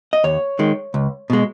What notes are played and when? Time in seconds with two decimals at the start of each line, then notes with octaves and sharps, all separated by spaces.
0.13 D#5
0.24 D#2 C#5
0.59 D#3 G#3
0.94 C#2
1.30 B2 G#3